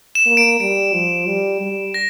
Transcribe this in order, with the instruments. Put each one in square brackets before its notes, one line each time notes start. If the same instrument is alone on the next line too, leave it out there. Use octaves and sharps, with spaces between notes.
[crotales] E7
[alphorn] A#3
[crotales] D7
[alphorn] G3 [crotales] D7
[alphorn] F3
G3
G3
[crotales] A#6